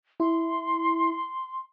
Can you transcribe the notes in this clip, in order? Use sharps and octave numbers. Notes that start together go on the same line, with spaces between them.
E4 C6